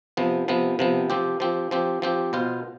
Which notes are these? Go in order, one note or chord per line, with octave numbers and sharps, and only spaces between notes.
C3 F3 B3
C3 F3 B3
C3 F3 B3
F3 C4 G4
F3 C4 G4
F3 C4 G4
F3 C4 G4
B2 B3 F4 C5